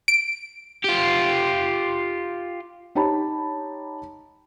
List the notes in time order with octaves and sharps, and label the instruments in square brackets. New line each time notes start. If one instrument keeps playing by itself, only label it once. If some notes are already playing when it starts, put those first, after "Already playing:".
[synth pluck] D7
[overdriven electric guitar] F4 G4
[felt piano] D#4 G4 C#5 A5 B5